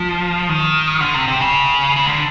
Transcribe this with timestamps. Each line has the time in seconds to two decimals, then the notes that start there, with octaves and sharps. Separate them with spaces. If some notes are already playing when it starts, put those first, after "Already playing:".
Already playing: F3
0.49 D#3
1.01 D3
1.14 C3
1.28 C3
1.40 C#3
1.96 C#3
2.06 D3